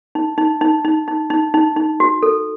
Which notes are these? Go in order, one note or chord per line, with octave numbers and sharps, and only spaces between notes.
D#4
D#4
D#4
D#4
D#4
D#4
D#4
D#4
F#4
A4